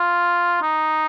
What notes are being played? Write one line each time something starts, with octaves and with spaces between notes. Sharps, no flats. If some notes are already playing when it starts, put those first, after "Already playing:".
Already playing: F4
D#4